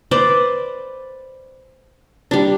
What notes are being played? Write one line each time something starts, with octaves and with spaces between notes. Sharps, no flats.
B4 C5 D5
G3 D4